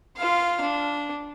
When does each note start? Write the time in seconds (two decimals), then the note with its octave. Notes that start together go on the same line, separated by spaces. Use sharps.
0.17 F4 F5
0.61 D4